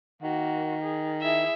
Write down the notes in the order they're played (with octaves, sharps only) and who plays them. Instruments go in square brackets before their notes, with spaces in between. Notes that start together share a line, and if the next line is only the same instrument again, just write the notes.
[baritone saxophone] D#3 [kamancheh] A#3 F#4
[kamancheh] G#4
[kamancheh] E4 G#4 [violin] E5